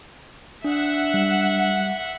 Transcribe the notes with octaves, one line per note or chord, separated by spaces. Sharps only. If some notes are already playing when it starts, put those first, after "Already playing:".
D4 E5 F#5
G3